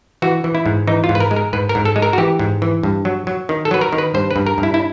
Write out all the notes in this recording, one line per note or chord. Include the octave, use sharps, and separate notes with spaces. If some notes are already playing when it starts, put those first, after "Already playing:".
E3 F#4
E3
E4
G#2
E3 D#4
F4
G#2
B4
A#4
G#3
A#4
G#2 B4
A#4
G#2
A4
G#3
A#4
F#4
E3 G4
G#2
E3
G2
F#3
F#3
D#3
A4
F#3 B4
A#4
D#3
B4
G2 C5
B4
G2
A#4
G2
E4
E4